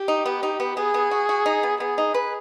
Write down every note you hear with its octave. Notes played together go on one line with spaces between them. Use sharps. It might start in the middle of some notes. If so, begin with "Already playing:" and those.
Already playing: G4
D#4
B3
D#4
B3
B3 G#4
B3
F#4
F#4
D#4
B3
B3 G#4
D#4
B4